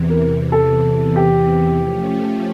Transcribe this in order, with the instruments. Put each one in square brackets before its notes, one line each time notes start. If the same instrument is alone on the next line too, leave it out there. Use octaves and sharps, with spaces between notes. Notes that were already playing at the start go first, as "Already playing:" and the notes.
Already playing: [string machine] E2 C3 E3
[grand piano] A#4
A4
G4
[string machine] F3 A3 C#4